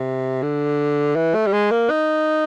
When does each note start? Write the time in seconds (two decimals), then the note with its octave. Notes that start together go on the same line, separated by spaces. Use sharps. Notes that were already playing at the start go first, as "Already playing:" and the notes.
Already playing: C3
0.42 D3
1.16 E3
1.35 A3
1.47 G3
1.53 G#3
1.71 A#3
1.90 D#4